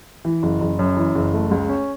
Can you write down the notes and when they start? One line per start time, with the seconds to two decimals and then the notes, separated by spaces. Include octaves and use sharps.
0.25 E3
0.43 F#1
0.61 F#1
0.79 F#2
0.97 E3
1.15 F#1
1.33 A3
1.51 C#2
1.69 C#4